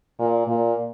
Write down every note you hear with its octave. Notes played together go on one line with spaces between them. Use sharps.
A#2
A#2